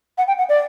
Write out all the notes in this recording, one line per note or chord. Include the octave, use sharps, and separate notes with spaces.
F#5
G5
F#5
D5